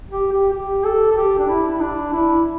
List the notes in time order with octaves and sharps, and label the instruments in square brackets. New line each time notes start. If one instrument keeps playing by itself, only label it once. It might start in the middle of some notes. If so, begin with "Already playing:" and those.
[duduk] G4
G4
G4
A4
A4
G4
D4
E4
E4
D4
E4